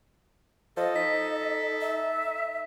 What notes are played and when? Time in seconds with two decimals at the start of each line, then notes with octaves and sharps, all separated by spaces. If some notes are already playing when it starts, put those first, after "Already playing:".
0.77 F3 A4 D#5
0.96 D#4 B6
1.81 E5